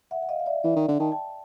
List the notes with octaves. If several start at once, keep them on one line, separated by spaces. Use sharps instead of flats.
E5 F#5
F#5
D#5 F5
F5
D5 E5
E3 D5 E5
D#3
D3
D#3 G5 A5
G5 A5